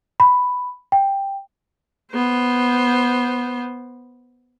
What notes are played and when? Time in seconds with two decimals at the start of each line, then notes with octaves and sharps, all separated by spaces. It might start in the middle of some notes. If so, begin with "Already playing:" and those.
0.20 B5
0.92 G5
2.12 B3 C5